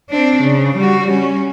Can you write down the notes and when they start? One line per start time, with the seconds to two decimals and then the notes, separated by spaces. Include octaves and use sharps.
0.10 C4 D4
0.42 C#3
0.77 G3 F#4
1.10 C#4